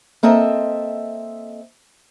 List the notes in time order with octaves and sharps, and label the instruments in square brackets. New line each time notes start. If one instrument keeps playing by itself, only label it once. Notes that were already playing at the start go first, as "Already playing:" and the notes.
[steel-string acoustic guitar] A#3 C4 A4 D#5 E5